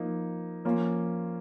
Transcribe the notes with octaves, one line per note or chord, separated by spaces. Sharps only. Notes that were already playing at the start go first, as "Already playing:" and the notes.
Already playing: F3 A#3 D#4
F3 A#3 C#4 F4